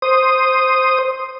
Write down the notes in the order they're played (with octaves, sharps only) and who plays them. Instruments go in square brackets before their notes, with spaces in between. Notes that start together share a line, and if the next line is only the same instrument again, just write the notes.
[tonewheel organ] C5 D#6